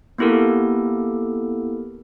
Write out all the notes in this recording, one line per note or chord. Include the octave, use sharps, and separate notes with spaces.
A#3 B3 E4 G4 A4 A#4